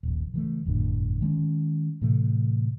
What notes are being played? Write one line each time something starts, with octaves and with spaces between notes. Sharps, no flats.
D#1 A#1
C#3 E3 A3
G1 F2 A2 D3
D#3 G#3 A3 C#4
A2 C3 E3 A3